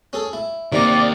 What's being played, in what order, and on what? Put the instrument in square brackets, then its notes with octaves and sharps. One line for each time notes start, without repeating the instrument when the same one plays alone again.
[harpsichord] C#4 G#4 A4
E4
[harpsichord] C3 A#5 [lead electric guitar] D#3 A#3 [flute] D5